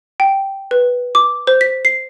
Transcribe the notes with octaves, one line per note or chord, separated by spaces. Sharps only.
G5
B4
D6
C5
B6
C7